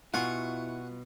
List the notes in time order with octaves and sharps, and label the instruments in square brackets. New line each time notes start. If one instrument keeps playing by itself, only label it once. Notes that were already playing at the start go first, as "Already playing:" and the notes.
[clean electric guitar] B2 [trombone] E4 [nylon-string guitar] F4 [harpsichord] F#5 G#5 C#6